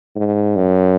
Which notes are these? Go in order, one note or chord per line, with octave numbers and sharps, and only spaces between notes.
G#2
F#2